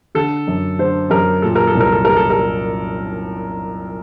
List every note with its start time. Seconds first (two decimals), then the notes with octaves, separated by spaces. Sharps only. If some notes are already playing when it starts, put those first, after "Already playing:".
0.15 D3 A4
0.47 F#2
0.79 D3 C5
1.10 F#2 A#4
1.42 A#2 A4
1.55 A#4
1.67 A4
1.75 C2
1.80 A#4
1.92 A4
2.05 A#2 A#4
2.17 A4
2.30 A#4